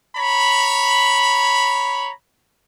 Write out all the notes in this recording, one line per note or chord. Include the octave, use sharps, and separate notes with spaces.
C#5 A#5 B5